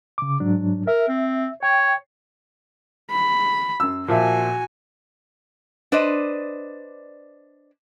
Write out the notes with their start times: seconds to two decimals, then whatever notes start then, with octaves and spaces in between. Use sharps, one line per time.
0.18 C#3 D6
0.40 G#2 F#3 D4
0.87 A#4 E5
1.08 C4
1.63 C#5 G5
3.12 B5
3.80 F#2 E6
4.08 A#2 F3 F#4 E5 G#5
5.92 D4 B4 C5 D5 D#5